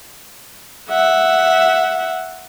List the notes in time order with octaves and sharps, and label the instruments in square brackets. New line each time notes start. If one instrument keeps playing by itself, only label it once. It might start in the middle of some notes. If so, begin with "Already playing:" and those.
[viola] E5 F#5